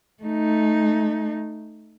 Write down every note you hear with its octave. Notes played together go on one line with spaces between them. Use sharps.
A3 D#4